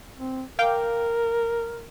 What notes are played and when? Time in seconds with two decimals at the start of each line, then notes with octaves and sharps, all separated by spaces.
0.18 C4
0.59 A#4 F5 G5 D6